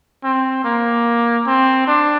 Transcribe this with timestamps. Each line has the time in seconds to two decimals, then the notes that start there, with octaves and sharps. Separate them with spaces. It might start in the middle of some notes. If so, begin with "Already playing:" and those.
0.24 C4
0.64 A#3
1.46 C4
1.87 D4